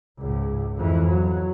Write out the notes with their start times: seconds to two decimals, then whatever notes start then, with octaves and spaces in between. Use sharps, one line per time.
0.19 C#2 G#2
0.77 F2 E3
1.09 F#3